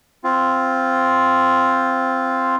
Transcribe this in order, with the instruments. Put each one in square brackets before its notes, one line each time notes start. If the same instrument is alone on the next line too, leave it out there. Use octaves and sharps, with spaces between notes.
[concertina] C4 F4